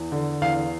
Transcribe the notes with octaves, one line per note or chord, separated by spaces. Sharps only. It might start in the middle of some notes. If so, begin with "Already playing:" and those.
Already playing: E2
D3
E2 F5